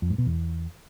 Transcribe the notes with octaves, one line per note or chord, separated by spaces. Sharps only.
F2
G#2
B2
E2